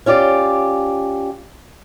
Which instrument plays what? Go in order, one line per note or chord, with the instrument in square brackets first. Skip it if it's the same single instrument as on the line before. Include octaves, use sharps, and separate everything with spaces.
[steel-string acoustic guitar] C#4 F4 G4 D5